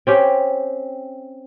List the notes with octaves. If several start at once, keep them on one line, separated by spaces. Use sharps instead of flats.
C4 C#4 G4